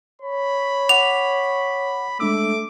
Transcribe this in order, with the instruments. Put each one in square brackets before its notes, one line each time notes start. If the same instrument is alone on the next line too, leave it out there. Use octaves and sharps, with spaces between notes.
[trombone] C#5 [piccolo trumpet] B5
[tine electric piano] F#5 D6 [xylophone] F7
[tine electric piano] G#3 D4 E6 [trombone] A3 [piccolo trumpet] D6